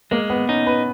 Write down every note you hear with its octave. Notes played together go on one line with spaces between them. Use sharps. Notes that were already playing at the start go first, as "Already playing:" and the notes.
G#3 A#3
B3
C#4 D#4
B4